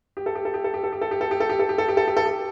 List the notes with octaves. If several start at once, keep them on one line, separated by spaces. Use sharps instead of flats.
G4
A4
G4
A4
G4
A4
G4
A4
G4
A4
G4
A4
G4
A4
G4
A4
G4
A4
G4
A4
G4
A4
G4